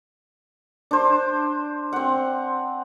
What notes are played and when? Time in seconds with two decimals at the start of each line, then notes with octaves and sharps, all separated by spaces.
0.91 D4 C5
1.93 C4 F#5